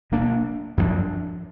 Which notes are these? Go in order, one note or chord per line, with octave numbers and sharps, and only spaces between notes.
B2 A#3 D4
F#2 F3 B3 D4